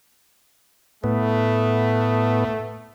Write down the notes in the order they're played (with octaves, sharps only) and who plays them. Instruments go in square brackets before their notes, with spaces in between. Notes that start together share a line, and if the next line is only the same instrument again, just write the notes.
[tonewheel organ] A2 B3 [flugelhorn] A3